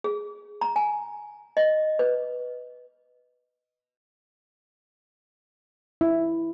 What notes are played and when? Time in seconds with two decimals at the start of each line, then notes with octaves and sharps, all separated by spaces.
0.04 G#4
0.61 A#5
0.76 G#5
1.57 D#5
1.99 B4
6.01 E4